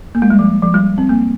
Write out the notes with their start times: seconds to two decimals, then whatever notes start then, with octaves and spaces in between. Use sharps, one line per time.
0.15 A#3
0.22 G#3
0.30 G3
0.39 F3
0.63 F3
0.74 G3
0.98 C4
1.09 A#3